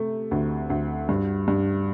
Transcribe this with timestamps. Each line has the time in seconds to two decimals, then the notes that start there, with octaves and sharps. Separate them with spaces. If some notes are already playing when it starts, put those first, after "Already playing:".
Already playing: C3 A3
0.31 D2
0.70 D2
1.09 G2
1.48 G2